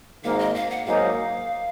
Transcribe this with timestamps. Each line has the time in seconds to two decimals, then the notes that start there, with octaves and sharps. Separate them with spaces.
0.24 G#1 G#2 D#3 A#3 F5
0.39 D#5
0.55 F5
0.70 F#5
0.86 G#2 F#3 A#3 D#4 F5